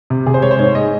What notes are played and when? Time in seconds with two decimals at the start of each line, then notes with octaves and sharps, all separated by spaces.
0.10 C3
0.26 C3 G#4
0.34 C5
0.42 G#3 C#5
0.51 C5
0.59 G#2 C#5
0.75 G#2 D#5